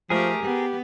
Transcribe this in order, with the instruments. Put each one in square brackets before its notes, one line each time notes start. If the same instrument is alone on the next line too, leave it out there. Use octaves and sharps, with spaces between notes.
[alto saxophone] F3 [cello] A3 G4 [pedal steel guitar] G#4 A#4
[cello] B3 [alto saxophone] G4